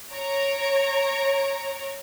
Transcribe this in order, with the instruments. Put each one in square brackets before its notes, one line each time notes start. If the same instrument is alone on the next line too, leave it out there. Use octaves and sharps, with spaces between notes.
[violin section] C#5 A#5 D7